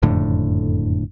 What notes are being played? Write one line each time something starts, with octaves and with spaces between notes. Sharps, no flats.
F#1 F2 A2 D3